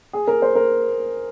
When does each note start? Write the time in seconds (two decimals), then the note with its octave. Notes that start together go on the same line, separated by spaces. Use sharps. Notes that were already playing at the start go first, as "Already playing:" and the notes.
0.13 G#4
0.28 A#4
0.42 C5
0.55 A#4